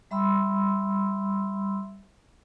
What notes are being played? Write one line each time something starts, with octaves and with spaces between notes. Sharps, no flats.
G3 E5 B5 C6 E6